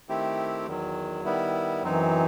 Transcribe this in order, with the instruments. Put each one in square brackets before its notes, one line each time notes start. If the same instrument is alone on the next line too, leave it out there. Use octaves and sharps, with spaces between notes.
[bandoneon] D#3 A3 C4 E4 G4
E2 D#3 F#3
D#3 G3 B3 E4
[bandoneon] F#2 F#3 C4 D#4 [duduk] E3